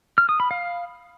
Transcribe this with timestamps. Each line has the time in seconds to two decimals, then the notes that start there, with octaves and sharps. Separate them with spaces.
0.18 F6
0.29 D#6
0.40 B5
0.51 F5